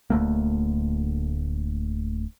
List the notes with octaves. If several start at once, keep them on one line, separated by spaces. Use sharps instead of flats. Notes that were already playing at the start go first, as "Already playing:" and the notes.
D1 D2 A3 A#3